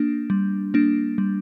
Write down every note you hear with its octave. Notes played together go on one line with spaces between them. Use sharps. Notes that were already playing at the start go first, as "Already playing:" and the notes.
Already playing: A#3 D4
G3
A#3 D4
G3